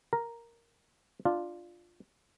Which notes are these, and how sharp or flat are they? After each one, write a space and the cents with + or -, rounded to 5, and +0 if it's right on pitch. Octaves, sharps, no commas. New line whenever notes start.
A#4 +0 A#5 +0
D4 +15 F4 +0